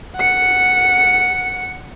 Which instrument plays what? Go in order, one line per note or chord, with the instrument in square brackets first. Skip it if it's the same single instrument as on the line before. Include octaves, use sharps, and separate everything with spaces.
[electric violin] F#5 C#7